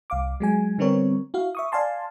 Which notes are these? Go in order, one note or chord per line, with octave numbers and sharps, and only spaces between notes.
C2 F5 D6
F#3 G#3 G#5
D3 G3 B3 C4 A#4 C#5
E4 F#4 F5
E5 C#6 D#6
D5 F5 G#5 A5 C6